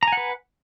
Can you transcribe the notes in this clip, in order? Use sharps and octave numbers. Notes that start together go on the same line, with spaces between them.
B4 F#5 G#5 A#5